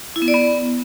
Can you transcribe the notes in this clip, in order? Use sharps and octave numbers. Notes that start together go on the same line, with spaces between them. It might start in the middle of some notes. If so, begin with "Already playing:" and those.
E4
B3
D5
B3